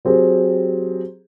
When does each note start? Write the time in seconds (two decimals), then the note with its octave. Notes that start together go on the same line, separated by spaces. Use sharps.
0.05 F#3 C4 G4 G#4 C5